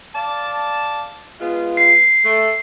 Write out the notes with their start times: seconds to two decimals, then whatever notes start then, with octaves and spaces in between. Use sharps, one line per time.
0.15 D5 F5 A5
1.41 G#3 B3 F4
1.77 C7
2.25 A3